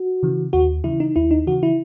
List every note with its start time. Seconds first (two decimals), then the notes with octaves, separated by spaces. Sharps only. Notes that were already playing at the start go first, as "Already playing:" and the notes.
Already playing: F#4
0.23 C#3 E3
0.53 D#2 F#4
0.84 C#3 E3 E4
1.00 D#4
1.16 D#2 E4
1.31 D#4
1.47 C#3 E3 F#4
1.63 E4